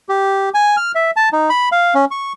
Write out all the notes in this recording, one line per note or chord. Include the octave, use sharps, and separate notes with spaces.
G4
G#5
F6
E5
A5
D#4
B5
F5
C#4
C#6